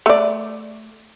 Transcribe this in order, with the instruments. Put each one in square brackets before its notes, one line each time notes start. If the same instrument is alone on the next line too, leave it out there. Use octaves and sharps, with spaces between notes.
[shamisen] A3 D5